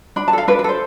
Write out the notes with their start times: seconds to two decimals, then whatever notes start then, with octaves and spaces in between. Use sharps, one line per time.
0.16 D4 B5
0.28 A5
0.33 A4 F5
0.48 D4 B4
0.59 B4
0.64 A4 C5